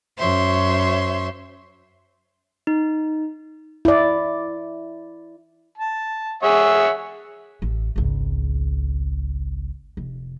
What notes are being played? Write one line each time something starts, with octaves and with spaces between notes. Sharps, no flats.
F#2 C5 C#5 E5 C6
D#4
E4 D5
A5
G#4 C#5 E5 F#5
A1
G#1 C#2
F1